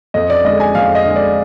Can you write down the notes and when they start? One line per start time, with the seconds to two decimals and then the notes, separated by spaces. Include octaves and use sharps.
0.14 F2 D#5
0.30 D5
0.45 D3 G#3 D#5
0.60 G#5
0.75 F2 F5
0.95 D#5
1.05 D3 G#3
1.16 D5